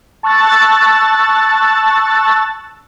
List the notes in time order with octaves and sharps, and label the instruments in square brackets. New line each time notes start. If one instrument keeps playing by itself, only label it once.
[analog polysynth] A5 C#6 E6 F#6 A6